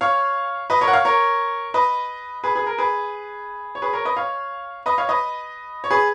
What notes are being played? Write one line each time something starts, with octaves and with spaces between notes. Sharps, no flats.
C#5 F5
B4 D#5
A#4 C#5
F#5
C#5 F5
A#4 C#5
B4 D#5
G#4 B4
G#4 B4
A#4
G#4 B4
C#5
G#4 B4
A#4 C#5
B4 D#5
C#5 F5
B4 D#5
C#5 F5
B4 D#5
C#5
G#4 B4